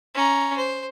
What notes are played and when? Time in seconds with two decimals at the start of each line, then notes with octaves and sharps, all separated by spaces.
0.15 C#4 A#5
0.56 C5